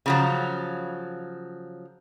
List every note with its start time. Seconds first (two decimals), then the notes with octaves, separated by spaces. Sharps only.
0.06 C#3 F3 F#3